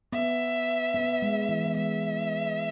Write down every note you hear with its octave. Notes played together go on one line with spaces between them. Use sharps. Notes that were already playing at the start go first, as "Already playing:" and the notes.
B3 E5
B3
G#3
E3
B3
G#3 E5